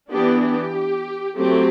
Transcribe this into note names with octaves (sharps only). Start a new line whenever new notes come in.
E3 B3 D4 G4
G4
F#3 A3 C4 G4